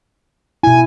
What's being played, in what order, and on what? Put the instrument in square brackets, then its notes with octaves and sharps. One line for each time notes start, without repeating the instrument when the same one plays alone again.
[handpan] B2 E4 [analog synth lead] G#5